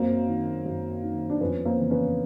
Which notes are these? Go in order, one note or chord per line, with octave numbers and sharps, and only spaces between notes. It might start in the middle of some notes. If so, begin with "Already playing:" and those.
Already playing: F#2 A#3 C4
D#3
F#2
D#3
D4
F2 B3 C#4
A#3 C4
C#3 E3
B3 C#4